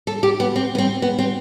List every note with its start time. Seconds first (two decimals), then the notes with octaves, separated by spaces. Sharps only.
0.07 A4
0.23 G4
0.40 B3
0.56 C4
0.75 B3
0.78 C4
1.02 B3
1.19 C4